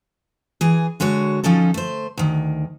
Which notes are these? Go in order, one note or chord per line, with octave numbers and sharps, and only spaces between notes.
E3 G#4
D3 G#3 F#4 C#5
F3 C#4 D#4 A4
A3 C5
D2 D#3